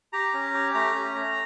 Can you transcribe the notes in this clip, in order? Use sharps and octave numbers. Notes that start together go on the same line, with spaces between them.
G4 A#5
C#4
G4
A3 A#5
C#4
A3